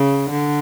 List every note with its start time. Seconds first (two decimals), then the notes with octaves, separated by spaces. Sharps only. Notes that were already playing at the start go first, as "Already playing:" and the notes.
Already playing: C#3
0.30 D3